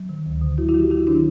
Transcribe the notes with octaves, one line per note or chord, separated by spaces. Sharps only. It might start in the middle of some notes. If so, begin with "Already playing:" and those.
Already playing: F#3
D#3
D2
D3
F#3 E4 F#4
E4 F#4
F#3
F4 G4
F#3 E4 F#4
D#3 D4 E4